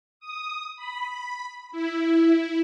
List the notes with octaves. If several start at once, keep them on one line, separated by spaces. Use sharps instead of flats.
D#6
B5
E4